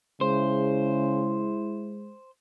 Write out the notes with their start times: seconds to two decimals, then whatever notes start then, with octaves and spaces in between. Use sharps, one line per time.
0.21 C#3 G#3 E4 C5